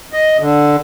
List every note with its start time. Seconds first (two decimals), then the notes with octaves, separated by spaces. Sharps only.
0.13 D#5
0.40 D3